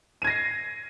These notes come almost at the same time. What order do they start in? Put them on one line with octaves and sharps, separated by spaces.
D#7 G#6 A#6 C7